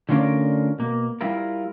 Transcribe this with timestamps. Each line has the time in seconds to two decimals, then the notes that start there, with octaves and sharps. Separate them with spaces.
0.09 D3 A3 C#4 F4 A#4 D5
0.79 B2 A#3
1.21 G3 E4 F4 A#4